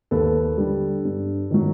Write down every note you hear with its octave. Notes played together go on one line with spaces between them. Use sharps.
D#2 A4 B4
D3 G3
G2
D#3 F#3